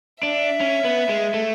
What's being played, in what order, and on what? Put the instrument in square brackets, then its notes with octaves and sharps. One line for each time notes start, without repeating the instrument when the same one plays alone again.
[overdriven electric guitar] D4 [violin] E5
[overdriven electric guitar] C#4
B3
G#3
A3